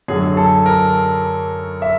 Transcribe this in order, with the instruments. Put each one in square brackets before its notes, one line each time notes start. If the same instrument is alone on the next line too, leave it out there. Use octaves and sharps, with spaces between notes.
[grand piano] F#2 D3 F#3 G#4
A4
A#4
E5